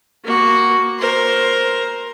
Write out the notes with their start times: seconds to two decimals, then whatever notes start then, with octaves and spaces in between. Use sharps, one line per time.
0.24 A#3 F#4
0.98 A#4 C5